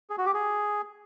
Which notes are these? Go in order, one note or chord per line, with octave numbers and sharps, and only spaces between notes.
G#4
F#4
G4
G#4